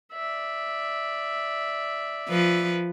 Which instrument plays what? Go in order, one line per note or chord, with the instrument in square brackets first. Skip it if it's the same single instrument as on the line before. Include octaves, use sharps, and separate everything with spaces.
[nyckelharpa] D5 E5
[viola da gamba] F3 B4